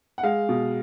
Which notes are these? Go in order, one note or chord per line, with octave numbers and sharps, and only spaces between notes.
F#5
G#3 F5
B2